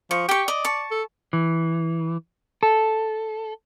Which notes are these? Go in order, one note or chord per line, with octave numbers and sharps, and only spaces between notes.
F3 C#6
G4 G5 C#6
D5 D#5
A5 C#6
A4
E3
A4